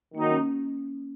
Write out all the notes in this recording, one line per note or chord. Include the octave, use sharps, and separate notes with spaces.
D#3 F#3 A#3 D#4
C#4